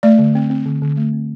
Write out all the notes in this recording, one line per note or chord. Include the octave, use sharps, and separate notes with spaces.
A3 D5
D3
C4
C4
D3
D3
A3
C4